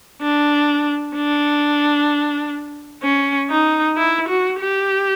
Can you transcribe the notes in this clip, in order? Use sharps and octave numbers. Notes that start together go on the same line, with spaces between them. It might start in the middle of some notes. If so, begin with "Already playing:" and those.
D4
D4
C#4
D#4
E4
F#4
G4